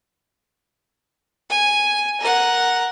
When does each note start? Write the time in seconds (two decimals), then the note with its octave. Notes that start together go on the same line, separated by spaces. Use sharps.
1.50 G#5
2.20 A#4 F#5